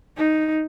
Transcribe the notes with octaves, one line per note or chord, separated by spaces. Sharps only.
D#4